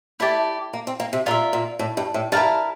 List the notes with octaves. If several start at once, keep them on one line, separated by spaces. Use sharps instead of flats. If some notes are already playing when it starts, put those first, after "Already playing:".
A3 E4 G4 D5
A#3
C4
A#3
C3
A#2 F4 A#4 E5
A#2
A2
G2
A2
G2 E4 A#4 F5 A5